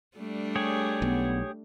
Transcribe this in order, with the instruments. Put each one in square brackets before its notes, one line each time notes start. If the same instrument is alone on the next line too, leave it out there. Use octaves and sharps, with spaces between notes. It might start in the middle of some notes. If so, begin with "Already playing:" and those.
[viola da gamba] G3 A3 D4
[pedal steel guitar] G4 G#4 C#5
[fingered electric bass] B1 [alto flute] B3